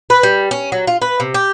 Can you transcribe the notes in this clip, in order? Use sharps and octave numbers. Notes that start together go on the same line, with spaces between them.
B4
G3
C#4
F#3
F4
B4
C3
G4